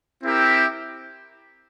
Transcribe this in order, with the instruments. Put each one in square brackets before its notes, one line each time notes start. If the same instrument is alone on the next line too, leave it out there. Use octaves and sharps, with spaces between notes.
[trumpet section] C4 E4 G4 A#4 E5